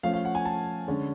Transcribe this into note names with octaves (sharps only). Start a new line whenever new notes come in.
F3 A3 C#4 F5
F5
F#5
G#5
A5
D3 G#3 C#4